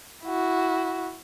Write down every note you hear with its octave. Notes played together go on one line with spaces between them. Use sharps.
E4 F#4